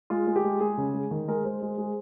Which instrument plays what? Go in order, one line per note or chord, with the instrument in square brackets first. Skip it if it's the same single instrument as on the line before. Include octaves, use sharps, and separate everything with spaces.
[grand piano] G#3 F4
G#3
G4
G#3
G#3 G#4
C#3
G#3
D#3
G#3 A#4
G#3 C5
G#3
G#3